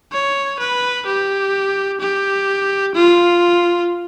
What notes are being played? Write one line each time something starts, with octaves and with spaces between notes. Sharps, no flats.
C#5
B4
G4
G4
F4